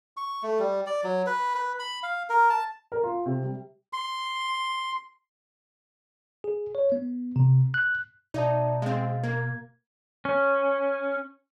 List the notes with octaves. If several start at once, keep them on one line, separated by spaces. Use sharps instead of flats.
C#6
A3
G3
D5
F#3
B4
B4
B5
F5
A#4
A5
A#4
F4
C3
G3
C6
G#4
C#5
B3
C3
F#6
B2 D#4 D5 E5 A5
G#3 C4 D#5 F5
A#3 G#6
C#4